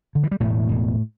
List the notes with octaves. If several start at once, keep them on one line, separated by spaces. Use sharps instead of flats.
D3
E3
G3
E1 A2 A3
E1